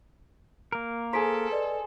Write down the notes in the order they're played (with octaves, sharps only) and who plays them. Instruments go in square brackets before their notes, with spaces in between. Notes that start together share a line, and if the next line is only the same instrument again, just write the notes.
[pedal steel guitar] A#3 A#4
[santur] G#4 C5 [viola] A4 [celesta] A#5 B6 D7
[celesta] B4 D5 D#5